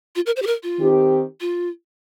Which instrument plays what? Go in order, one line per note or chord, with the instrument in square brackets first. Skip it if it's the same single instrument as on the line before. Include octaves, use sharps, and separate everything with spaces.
[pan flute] F4
A#4
C5
G4
A#4
F4
[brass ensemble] D#3 C4 G4
[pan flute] F4